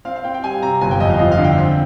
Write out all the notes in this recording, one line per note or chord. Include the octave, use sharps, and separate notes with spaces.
C4 F5
F5
C4 G5
G5
G3 G#5
C3 A#5
G1 G#5
G5
F2 D#5
F5
F3 D#5
F5
D3
G5
C4